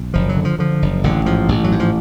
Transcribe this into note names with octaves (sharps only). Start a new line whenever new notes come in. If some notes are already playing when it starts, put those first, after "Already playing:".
Already playing: B1
F#1 F3
F#3
D3
F3
D3 F3
F#1
A1 D3
G#2 F3
A1
F#3
G#2
F3